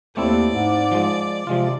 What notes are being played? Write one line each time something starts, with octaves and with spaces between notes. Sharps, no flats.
D#2 A3 C4 E4 D5
G#2
F3 G#3
C3 F3 G#3 F4